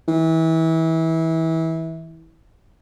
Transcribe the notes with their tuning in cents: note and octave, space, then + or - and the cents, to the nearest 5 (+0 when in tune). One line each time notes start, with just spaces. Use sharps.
E3 -25